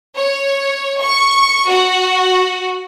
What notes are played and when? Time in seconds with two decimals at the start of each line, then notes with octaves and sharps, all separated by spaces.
0.17 C#5
1.01 C#6
1.68 F#4